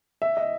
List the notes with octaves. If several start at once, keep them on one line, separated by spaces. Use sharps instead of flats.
E5
D#5